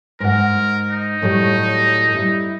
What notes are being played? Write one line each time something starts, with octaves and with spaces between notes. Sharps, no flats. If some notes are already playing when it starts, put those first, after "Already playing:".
G#2 A#4 F#5
D#4
A2 F#3 G3
G3 E4